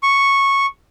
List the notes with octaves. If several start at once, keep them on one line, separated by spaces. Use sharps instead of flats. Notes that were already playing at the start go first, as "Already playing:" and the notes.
C#6